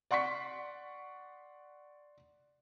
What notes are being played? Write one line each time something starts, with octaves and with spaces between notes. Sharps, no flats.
D5 F#5 C6 C#6 B6